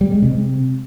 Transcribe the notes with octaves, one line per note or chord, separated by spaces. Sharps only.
G3
G#3
C3